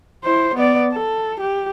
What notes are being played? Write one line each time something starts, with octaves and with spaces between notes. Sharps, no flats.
E4 C5
B3 D5
A4
G4